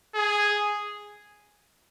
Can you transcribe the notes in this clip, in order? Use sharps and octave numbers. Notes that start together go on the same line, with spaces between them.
G#4